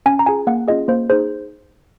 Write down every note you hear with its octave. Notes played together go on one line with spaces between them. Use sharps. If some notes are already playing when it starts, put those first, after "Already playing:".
C#4 G#5
A#5
F4 G#4 G#5
A#3 F#5
C#4 F4 G#4 D#5
A#3 C5
D#4 G#4 C5